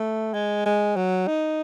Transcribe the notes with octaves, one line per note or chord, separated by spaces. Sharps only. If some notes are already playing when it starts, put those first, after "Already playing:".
Already playing: A3
G#3
G#3
F#3
D#4